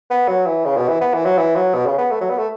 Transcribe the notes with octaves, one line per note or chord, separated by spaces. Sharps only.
B3
F#3
E3
C#3
B2
E3
B3
E3
F#3
E3
F#3
B2
C#3
B3
A3
F#3
B3
A3